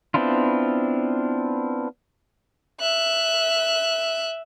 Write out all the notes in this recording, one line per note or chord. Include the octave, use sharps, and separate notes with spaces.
B3 C4 D4 E4 F4
E5 F#6